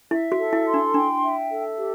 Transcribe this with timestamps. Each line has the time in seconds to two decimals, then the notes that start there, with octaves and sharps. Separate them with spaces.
0.11 E4 E5
0.32 F#4
0.39 A4
0.53 E4
0.67 C6
0.74 D4
0.94 D4 G5
1.22 E5
1.50 A4
1.78 G4